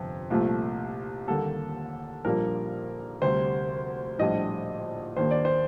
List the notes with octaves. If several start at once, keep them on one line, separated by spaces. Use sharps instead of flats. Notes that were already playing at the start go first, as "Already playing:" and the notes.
Already playing: G1 F2 C3
C2 A#2 F3 A3
D#2 D3 G3 A#3 A4
A#1 A#2 G3 A#3 D4 A#4
D2 C3 G3 C5
A#1 A2 G3 D4 D#5
D#2 D#3 A#3 D4 C5
D5
C5